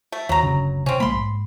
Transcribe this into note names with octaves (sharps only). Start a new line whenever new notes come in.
A3
D#2 F#3 A#5
F#1 D2 C#3
C3 C4 C#4
A#1 G#3 A#3 B5 C6
G#2